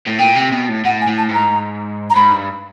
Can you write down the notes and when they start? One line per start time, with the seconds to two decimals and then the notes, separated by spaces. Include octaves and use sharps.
0.07 A2
0.19 A#2 G5
0.36 C3
0.52 B2
0.69 A2
0.85 A2 F#5
1.01 G#5
1.07 A2
1.18 A5
1.29 G#2
1.34 A#5
2.10 A#5
2.15 G#2 B5
2.32 G2